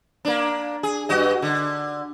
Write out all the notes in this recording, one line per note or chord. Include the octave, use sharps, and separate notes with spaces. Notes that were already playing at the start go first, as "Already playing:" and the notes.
A#3 D4
G#4
G2 F#4 D#5
D3